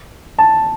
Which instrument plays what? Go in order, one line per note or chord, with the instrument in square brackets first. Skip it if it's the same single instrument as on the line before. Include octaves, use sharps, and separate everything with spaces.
[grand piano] A5